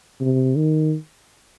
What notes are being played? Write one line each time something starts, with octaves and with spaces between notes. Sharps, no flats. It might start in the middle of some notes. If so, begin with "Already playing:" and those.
C3
D#3